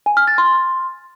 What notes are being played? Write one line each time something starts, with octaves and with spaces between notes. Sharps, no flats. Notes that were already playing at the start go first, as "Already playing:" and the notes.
G#5
F6
A6
C6